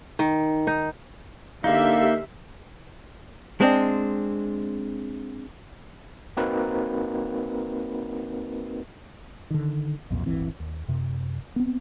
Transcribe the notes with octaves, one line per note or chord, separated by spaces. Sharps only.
D#3
D#4
D3 A#3 D#4 G4 E5 F5
G#3 C4 D4
A#3 C4 D#4 F#4 A#4 B4
D3 D#3
B1 F2 A#2
D1 G1 E3 C4
D#2
F#2 C3
B3 C4